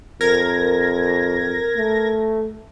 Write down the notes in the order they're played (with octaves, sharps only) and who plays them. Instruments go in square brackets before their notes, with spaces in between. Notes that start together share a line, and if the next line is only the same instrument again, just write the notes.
[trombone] F2 [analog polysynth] A#4 G#6 A#6
[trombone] A3